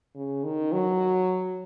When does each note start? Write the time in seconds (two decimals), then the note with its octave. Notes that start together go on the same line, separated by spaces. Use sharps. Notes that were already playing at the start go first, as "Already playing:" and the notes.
0.15 C#3
0.44 D#3
0.72 F#3